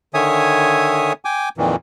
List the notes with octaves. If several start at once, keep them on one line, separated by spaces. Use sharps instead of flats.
D3 D#3 C#5 E5 G#5 D#6
G5 G#5 D6
F2 A#2 D#3 E3